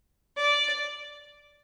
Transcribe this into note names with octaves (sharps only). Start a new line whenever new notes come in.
D5